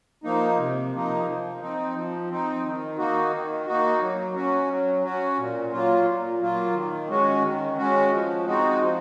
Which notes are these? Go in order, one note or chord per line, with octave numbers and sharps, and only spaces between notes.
F3 A#3 D#4
C3
F3 A#3 D#4
F3
C4 D#4
F3
C4 D#4
D#3
A#3 D#4 F#4
D#3
A#3 D#4 F#4
F#3
C#4 F#4
F#3
C#4 F#4
A#2
F#3 A#3 F4
A#2
F#3 A#3 F4
D#3
G#3 C#4 F#4
D#3
G#3 C#4 F#4
F3
G#3 C4 D#4 F#4
F3